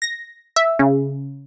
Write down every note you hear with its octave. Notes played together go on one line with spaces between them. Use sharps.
A#6
E5
C#3